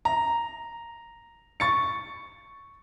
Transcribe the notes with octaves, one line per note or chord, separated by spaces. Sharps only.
A#5
C#6 A6 C#7